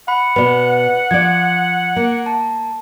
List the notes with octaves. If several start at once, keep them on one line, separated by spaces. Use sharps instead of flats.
F#5 B5
B2 B3 B4 D5
F3 D5 G#6
A#3
A5